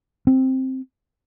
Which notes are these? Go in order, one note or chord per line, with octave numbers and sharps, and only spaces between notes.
C4